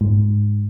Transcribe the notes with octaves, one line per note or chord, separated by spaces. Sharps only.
G#2